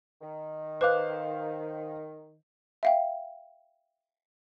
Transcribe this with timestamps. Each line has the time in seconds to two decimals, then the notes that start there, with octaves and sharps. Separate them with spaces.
0.21 D#3
0.81 B4 C5 F5 D6 F#6
2.83 E5 F5 G5